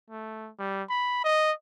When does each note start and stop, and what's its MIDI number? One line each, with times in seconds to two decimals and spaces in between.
0.10 0.50 57
0.59 0.83 55
0.89 1.20 83
1.24 1.52 75